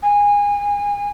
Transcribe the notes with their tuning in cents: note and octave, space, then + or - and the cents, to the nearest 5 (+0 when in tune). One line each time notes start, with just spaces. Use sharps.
G#5 -25